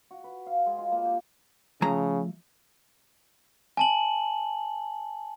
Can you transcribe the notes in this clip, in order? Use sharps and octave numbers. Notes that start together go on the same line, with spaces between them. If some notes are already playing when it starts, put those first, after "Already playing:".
F#4
B4
F5
G#3
F4
A#3
G4
C#3 F3 A3 A#5
G#5 A5 F#7